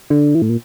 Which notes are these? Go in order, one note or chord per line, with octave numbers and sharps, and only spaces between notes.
D3
E3
A2
A#2